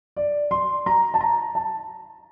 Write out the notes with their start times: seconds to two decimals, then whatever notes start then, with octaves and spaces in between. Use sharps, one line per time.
0.17 D5
0.51 C6
0.86 A#5
1.14 A5
1.21 A#5
1.55 A5